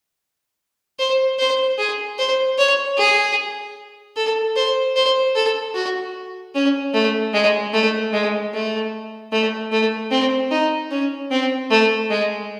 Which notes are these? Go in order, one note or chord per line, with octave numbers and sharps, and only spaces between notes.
C5
C5
G#4
C5
C#5
G#4
A4
C5
C5
A4
F#4
C#4
A3
G#3
A3
G#3
A3
A3
A3
C4
D#4
C#4
C4
A3
G#3